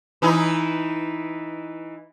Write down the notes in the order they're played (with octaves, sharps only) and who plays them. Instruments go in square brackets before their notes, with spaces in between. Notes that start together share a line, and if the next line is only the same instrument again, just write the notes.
[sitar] E3 D#4 E4